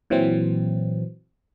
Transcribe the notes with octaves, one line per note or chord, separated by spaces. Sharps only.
A#2 E3 F#3 C4